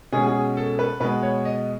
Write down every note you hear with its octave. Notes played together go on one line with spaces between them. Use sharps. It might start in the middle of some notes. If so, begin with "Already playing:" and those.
B2 G#3 C#4 G#4
G#4
A4
B4
B2 G#3 B3 B4
C#5
D#5